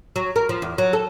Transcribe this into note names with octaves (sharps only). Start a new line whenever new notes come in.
F#3
A#4
F3
E2
F#3
A4